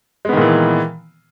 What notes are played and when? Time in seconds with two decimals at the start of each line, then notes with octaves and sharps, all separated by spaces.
0.25 G#3
0.29 B3
0.33 D#3
0.37 A#2
0.41 E3